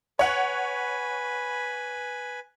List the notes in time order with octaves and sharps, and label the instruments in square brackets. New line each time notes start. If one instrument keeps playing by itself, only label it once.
[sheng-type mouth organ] B4 G#5 B5 [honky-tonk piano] C#5 F#5